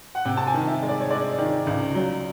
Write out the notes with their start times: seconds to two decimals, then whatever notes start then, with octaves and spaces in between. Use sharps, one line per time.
0.15 F#5
0.25 C3 G5
0.37 A5
0.47 G#5
0.54 D#3
0.67 E5
0.82 G#3
0.89 D5
1.00 C#5
1.10 G#3 D5
1.38 D#3
1.67 C#2
1.95 F#3